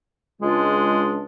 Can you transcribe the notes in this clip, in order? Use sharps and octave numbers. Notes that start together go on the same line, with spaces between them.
C#2 G#3 D4 F4